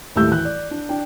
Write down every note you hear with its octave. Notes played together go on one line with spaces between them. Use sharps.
D#2 A2 G3 A3 E6 G6
E3 F#6
D5
D4
D4 G5